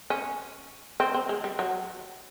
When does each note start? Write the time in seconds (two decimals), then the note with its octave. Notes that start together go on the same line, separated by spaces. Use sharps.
0.10 C#4
1.00 C4
1.14 C4
1.29 G#3
1.44 G3
1.59 F#3